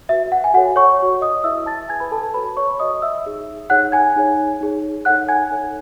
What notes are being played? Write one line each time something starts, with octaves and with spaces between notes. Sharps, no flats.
F#4 B4 E5
F#5
G#5
F#4 A4 C#5 F#5
C#5 C#6
F#4 A4 C#5
D#5 D#6
E4 G#4 B4 E5 E6
A5 A6
E4 G#4 B4 G#5 G#6
B4 B5
A4 A5
A4 A5
F#4 B4 C#5 B5
C#5 C#6
F#4 C#5 D#5 D#6
E5 E6
D#4 G#4 C#5
D#4 G#4 C#5 F#5 F#6
G#5 G#6
D#4 G#4 C#5
D#4 G#4 C#5
D#4 A4 C#5 F#5 F#6
G#5 G#6
D#4 A4 C#5